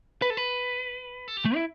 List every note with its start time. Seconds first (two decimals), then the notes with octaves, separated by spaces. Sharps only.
0.22 B4
0.30 A4
0.37 B4
1.28 A4
1.37 G4
1.45 A3
1.55 E4